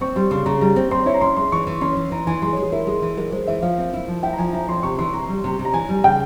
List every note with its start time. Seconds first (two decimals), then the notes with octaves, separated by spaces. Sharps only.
0.01 C4 C#6
0.16 G3 C6
0.31 C#3 C6
0.46 C#3 A#5
0.61 G3 A#5
0.76 C4
0.91 C4 C6
1.06 E4 C#5
1.14 A#5
1.21 C#4 C6
1.36 G#3 C6
1.52 E3 C#6
1.67 E3
1.81 C#4 C6
1.97 E3
2.12 E3 A#5
2.27 E3 G#5
2.42 G#3 C6
2.53 G#3 C#5
2.62 G#4
2.72 E4 A#4
2.87 G#3 G#4
3.02 E3
3.17 G#3 A#4
3.32 G#3 C5
3.47 E3 E5
3.62 F3 F5
3.78 C4
3.93 E4
4.08 F3
4.23 E4 G5
4.33 A#5
4.38 F3 G#5
4.53 E4 A#5
4.69 F3 C6
4.83 C3 C#6
4.99 E3 C6
5.13 C3 A#5
5.29 G3
5.44 C3
5.59 C3
5.65 A#5
5.74 E3 G#5
5.89 G3
6.04 C#3 G5